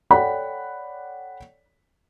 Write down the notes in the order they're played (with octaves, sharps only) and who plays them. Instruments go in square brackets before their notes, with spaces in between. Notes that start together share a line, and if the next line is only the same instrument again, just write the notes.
[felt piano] A4 C#5 D5 F#5 G5 B5